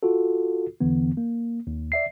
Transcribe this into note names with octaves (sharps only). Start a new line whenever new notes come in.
F4 F#4 A4
E2 D3 E3 B3
A#3
D#2
D5 E5 C7